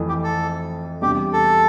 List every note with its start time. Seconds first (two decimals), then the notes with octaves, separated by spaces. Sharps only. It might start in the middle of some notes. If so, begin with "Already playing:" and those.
Already playing: F2 E3 A3
0.09 G4
0.24 A4
1.02 E2 C3 G3 D4 G4
1.33 A4